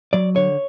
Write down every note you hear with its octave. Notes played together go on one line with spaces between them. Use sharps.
F#3 D5
D3 C#5